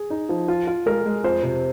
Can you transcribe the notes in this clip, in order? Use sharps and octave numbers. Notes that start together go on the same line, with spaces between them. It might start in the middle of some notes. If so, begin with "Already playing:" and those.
Already playing: G#4
D#4
F3
F4
F4
G#3 A#4
G#3
F2 C5
C3